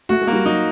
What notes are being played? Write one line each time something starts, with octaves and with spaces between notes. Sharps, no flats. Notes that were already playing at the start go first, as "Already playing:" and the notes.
A3 F#4
G#3
A#3
G3
F#3 D#4